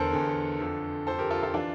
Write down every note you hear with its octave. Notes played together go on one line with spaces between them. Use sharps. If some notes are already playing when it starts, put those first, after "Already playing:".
Already playing: E2 D3 A4 A#4 C5
E2 D3
F2 D3
F2 D3 A4 C5
G4 A#4
F4 A4
F4 A4
E3 D4 F4